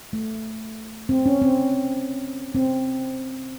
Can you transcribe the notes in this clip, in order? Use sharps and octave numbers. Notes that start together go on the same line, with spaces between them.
A3
C4
C#4
C4
C4